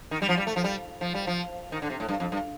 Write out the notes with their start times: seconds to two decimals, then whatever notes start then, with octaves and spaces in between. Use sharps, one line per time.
0.11 D#3
0.22 G3
0.29 F3
0.37 G3
0.47 A3
0.56 F3
0.64 G3
1.01 F3
1.14 G3
1.27 F3
1.72 D#3
1.82 D3
1.90 C3
2.00 A2
2.09 G2
2.20 F2
2.32 G2